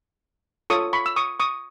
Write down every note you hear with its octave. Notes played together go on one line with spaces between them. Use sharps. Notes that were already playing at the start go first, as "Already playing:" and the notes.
F4 A4 C#5 C#6 D#6
B5 C#6
E6
C#6 D#6
C#6 D#6